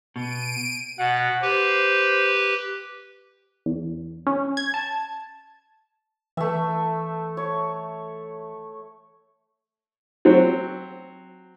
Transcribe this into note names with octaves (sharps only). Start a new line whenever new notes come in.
B2 D7 D#7
B2 F#5
G4 B4 C5
E2
C#4
G#6
A5
E3 A3 E5
C#5
F#3 C4